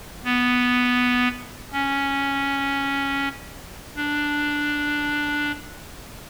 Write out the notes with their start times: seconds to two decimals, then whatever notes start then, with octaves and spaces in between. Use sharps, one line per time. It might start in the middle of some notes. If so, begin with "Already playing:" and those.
0.24 B3
1.73 C#4
3.96 D4